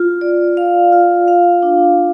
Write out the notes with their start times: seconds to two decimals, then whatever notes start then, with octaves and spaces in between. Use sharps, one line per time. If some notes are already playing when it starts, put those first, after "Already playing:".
Already playing: F4
0.21 D5
0.57 F5
0.92 F4
1.28 F5
1.63 D4